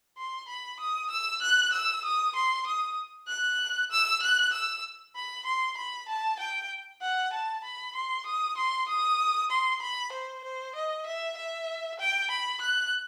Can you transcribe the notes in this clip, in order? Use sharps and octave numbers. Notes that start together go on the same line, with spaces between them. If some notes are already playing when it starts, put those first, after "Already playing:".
C6
B5
D#6
E6
F#6
E6
D#6
C6
D#6
F#6
E6
F#6
E6
B5
C6
B5
A5
G5
F#5
A5
B5
C6
D#6
C6
D#6
C6
B5
C5
C5
D#5
E5
E5
G5
B5
F#6